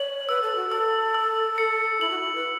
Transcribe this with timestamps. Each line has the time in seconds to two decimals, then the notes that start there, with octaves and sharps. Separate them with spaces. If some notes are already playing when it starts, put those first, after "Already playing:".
Already playing: C#5 F#7
0.28 B4 E6
0.42 A4
0.56 F#4
0.69 A4 E6
1.14 E6
1.58 C#7
2.01 E4 F#7
2.10 F#4
2.20 E4
2.35 B4